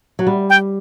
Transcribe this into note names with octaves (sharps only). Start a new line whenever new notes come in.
F#3
G3
G5